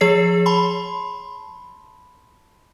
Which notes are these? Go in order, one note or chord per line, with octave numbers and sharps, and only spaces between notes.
F3 G#4 C#5 C7
A5 B5 C6